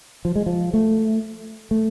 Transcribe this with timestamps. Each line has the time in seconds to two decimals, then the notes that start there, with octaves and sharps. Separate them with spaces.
0.25 F3
0.36 G#3
0.46 F3
0.74 A3
1.71 A3